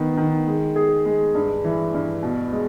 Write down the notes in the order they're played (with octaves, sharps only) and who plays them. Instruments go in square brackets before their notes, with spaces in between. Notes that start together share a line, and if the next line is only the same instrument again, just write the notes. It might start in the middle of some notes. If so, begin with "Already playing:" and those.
Already playing: [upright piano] D#3 B3
D#3
G#3
G#4
G#3
G2
E3
G2
B2
G#3